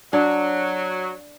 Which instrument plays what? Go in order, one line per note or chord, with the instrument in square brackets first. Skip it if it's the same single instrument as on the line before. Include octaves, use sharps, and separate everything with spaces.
[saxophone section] F#3 [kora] D4